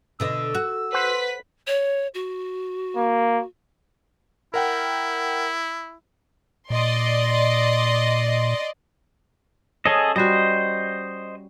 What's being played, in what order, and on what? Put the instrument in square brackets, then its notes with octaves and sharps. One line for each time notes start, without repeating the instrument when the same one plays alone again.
[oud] B2 D3 D#5 [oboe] E6
[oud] F#4
[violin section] B4 B6 [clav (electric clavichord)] C5 F#5
[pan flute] C#5
F#4
[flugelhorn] A#3
[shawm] E4 [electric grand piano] A#4 F#5 G5
[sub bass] A#2 [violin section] D5 D#5 C6
[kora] C#4 [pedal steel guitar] G#4 A4 D#5
[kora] G3 F#4 [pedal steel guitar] C5 D#5